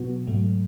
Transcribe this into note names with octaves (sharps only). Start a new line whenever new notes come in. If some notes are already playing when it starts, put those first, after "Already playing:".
Already playing: B2 F#3 B3 F#4
G#2 F#3 A3